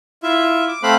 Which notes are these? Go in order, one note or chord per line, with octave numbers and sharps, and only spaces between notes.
E4 F4 E5
D6
A3 C4 C5 F5 B5 F#6